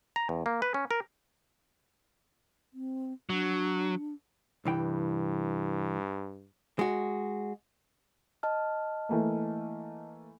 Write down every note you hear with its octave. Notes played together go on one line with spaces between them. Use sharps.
A#5
E2
A#3
B4
C#4
A#4
C4
F#3 D4
C2 G2 E3 G5
G#3 F#4
D#5 A5 F6
E3 A3 A#3